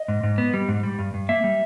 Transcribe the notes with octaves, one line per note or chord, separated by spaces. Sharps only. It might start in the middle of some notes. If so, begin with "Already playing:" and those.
Already playing: D#5
G#2
G#2
B3
G3
G#2
G3
G2
G2
A#3 E5
G3